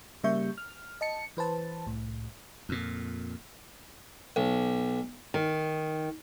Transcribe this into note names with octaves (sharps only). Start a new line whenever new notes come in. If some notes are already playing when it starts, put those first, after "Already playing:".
C#3 G3 A#3 E5 C#6 G6
F6
D#5 A5 C#7
E3 B4 C5 A5
C2 A2
F2 A#2
B1
D#3